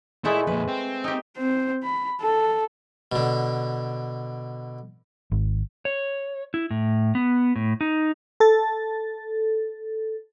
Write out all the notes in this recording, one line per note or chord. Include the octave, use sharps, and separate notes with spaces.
A#2 G#3 A3 E4
F2 A#2 B4
C4
D#4 G4
C4 C5
B5
A4
B2 D3
G#1
C#5
E4
A2
B3
A2
D#4
A4 A6